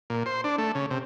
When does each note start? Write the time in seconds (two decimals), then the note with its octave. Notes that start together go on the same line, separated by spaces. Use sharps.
0.10 A#2
0.26 C5
0.44 D4
0.58 A3
0.75 C#3
0.90 C3